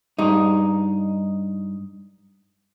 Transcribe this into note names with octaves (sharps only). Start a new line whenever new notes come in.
G2 D#4